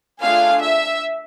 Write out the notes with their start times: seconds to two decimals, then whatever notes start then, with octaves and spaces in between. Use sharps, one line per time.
0.21 A3 D4 F4 G#4 F5
0.62 E5